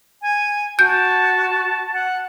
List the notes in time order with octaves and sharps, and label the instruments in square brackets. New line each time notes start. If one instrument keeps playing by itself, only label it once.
[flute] G#5
[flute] F#4 [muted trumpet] A5 [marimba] G6
[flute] F#5